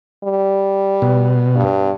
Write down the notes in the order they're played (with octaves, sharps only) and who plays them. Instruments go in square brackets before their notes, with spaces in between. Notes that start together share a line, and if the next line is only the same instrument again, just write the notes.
[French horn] G3
[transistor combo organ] B2
[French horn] G2